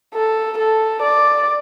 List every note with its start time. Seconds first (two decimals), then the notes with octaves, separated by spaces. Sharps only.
0.14 A4
0.58 A4
1.02 D5